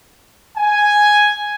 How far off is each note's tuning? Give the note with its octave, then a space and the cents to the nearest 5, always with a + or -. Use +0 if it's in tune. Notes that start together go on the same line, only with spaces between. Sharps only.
G#5 +0